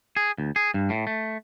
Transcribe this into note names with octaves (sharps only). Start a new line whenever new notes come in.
G#4
D2
G#4
G2
A2
A3